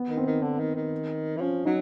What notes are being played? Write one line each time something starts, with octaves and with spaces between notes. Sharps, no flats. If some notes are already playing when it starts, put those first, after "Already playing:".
Already playing: B3
D#3
C4
D#3
D3
D#3
D#3
E3
F3 C#4
F#3 D#4